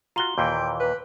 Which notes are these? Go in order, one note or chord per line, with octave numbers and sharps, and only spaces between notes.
F4 F#4 A#5 C6 G7
D#2 A#2 E3 G5
B4